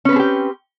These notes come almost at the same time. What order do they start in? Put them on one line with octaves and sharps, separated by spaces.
C#4 B4 C4 G#4 G4